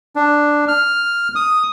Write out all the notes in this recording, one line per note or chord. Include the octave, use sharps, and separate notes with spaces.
D4
F6
D#6